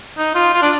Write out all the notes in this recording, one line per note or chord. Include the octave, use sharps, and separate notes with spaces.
D#4
F4
F4
D4